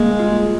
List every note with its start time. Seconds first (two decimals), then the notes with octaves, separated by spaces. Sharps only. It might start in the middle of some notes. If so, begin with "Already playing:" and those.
Already playing: G3 G#3 A#3
0.19 F4